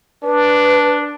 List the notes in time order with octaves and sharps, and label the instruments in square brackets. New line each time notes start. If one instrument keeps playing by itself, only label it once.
[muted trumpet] D4 [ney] B4